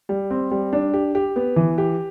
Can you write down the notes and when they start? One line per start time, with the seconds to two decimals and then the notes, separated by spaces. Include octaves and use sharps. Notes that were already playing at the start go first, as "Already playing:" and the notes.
0.09 G3
0.31 C4
0.51 G3
0.73 D4
0.94 G4
1.15 G4
1.36 B3
1.56 E3
1.78 G4